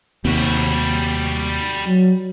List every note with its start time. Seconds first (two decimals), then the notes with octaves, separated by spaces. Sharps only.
0.25 D#2 C3 G3 F#4
1.87 F#3